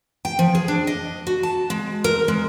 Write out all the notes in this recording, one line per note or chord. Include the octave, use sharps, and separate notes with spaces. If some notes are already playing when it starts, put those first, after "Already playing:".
G5
F3
G#4
D4
D#5
F#4
A5
G#3
A#4
G#3